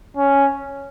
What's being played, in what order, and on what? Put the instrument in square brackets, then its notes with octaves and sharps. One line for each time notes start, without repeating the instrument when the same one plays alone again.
[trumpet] C#4